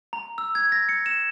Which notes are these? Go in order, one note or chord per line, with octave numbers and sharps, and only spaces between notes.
A#5
E6
G#6
A#6
C#7
E7